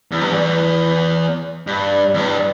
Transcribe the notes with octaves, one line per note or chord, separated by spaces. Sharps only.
E2
G2
E2
G2
E2
G2